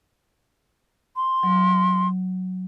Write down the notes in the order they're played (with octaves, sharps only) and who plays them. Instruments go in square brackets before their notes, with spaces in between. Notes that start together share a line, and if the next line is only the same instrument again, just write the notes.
[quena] C6
[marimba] F#3